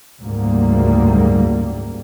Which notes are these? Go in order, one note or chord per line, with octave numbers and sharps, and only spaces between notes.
F#1 D2 G#2 G3 A#3